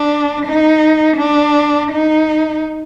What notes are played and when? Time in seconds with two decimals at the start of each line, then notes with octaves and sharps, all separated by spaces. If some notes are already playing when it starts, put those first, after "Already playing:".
Already playing: D4
0.46 D#4
1.18 D4
1.91 D#4